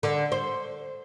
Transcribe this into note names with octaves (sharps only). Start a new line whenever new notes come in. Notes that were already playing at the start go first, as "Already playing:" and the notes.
D3
C5